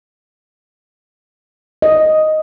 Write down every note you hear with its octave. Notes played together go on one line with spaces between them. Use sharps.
D#5